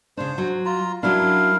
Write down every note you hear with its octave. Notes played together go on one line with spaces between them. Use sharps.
C#3 D4 C5
F#3
F4 A#5
F#3 C#4 D4 E4 A#4 F5